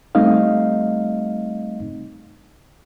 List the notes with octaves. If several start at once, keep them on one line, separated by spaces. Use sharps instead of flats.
G3 A3 C4 D#4 D#5 F5